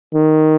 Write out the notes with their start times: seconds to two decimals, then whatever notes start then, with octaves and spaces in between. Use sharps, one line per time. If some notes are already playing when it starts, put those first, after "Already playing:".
0.14 D#3